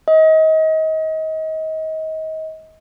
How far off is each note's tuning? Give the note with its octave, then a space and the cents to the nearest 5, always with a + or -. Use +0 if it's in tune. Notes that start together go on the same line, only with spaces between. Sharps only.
D#5 +30